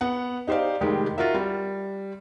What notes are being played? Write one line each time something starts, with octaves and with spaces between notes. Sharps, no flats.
B3 F#5
D#4 G4 C5 D5 F5
F1 D#3 G#3 G4
F4 F#4 A#4 E5
G3